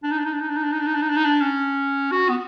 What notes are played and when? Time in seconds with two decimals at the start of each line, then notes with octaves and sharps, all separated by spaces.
0.03 D4
0.11 D#4
0.18 D4
0.25 D#4
0.33 D4
0.40 D#4
0.49 D4
0.56 D#4
0.63 D4
0.72 D#4
0.79 D4
0.86 D#4
0.94 D4
1.02 D#4
1.09 D4
1.16 D#4
1.24 D4
1.41 C#4
2.11 F#4
2.29 B3